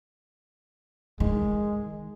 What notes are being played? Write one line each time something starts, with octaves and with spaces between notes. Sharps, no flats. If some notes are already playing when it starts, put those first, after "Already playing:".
D#3 G#3